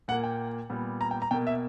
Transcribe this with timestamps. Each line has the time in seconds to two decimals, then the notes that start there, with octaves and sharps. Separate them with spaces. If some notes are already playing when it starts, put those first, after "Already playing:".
0.08 A#2 F#5
0.12 A#3
0.24 G5
0.70 A#2 G3 B3
1.01 A#5
1.11 G5
1.22 A#5
1.31 B2 A#3 G5
1.47 E5